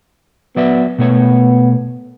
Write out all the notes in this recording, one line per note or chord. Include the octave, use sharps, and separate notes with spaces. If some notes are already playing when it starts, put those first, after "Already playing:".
F#3 B3 D5 E5
B2 A3 B3 C#5